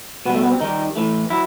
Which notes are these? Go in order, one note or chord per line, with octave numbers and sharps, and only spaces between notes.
B2 G3 B3
A3
B3
C4
D#3 G3 D#4
A2 E3 A3
F#3 E4